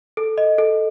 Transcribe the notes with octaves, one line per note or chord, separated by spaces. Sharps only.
A4
D#5
A4